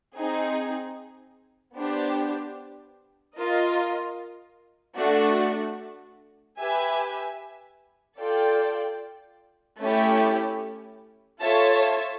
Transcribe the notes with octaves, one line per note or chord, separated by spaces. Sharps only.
C4 D#4 G#4
B3 D4 G4 C5
F4 A#4 D#5
A3 D4 F#4
G4 B4 E5 G#5
F4 A4 D5 G5
A3 C#4 E4 G4
F4 A4 C#5 E5 A5